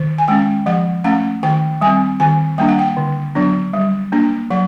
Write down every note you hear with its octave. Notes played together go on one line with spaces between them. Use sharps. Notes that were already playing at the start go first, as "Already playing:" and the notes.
Already playing: D#3
G#5
G#3 C#4 G5
F3 F#5
A3 C#4 F#5
D#3 G5
G3 C4 G#5
D#3 G#5
G3 A#3 D4 G5
F#5
G5
D3
F#3 B3 D4
G3
A#3 D4
F#3 F#5